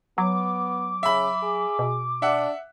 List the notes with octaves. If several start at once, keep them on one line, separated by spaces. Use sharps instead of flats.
F#3 B3 D6
C#3 E5 B5
G#4
B2
D4 E5 F#5